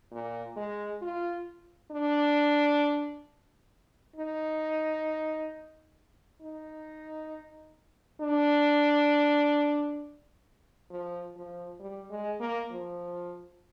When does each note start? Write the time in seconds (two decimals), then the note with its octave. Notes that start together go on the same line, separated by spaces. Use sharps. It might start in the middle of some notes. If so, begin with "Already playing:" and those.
0.12 A#2
0.56 G#3
1.02 F4
1.91 D4
4.16 D#4
6.41 D#4
8.21 D4
10.90 F3
11.36 F3
11.80 G3
12.10 G#3
12.40 A#3
12.71 F3